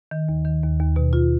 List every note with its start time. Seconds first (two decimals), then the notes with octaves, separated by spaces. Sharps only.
0.11 D#3
0.29 D#2
0.45 D#3
0.63 D#2
0.80 D#2
0.96 B2
1.13 F4